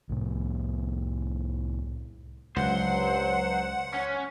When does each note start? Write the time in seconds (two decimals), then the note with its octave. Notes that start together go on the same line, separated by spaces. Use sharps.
0.09 C2 A2
2.56 C#2 G2 F#3 C5 F#5
3.94 C#4